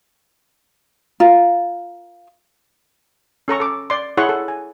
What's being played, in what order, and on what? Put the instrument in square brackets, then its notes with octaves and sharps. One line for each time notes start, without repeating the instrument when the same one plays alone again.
[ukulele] F4 A#4
[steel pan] C#4 A4 A#5 C#6
A4 D6
D5 C6
E4 G#4 C#5 F#5 C6 C#6
A4
G#5